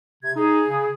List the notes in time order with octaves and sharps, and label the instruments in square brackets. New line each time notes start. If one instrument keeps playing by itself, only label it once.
[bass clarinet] C3 [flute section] G#6
[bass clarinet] D#4 [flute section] G#4
[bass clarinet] C#3